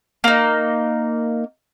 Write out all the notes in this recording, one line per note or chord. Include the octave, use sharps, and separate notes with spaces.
A#3 D#4